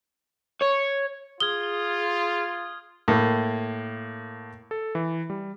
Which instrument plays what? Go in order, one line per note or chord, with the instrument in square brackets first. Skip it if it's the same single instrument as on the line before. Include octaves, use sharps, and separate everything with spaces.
[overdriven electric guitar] C#5
[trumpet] F4 [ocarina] G#4 [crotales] D#6 F6 G#6 [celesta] G7
[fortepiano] A2 A#3
[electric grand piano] A4
E3
G3